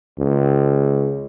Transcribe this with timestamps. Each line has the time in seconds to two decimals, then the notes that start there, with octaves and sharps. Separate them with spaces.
0.19 C#2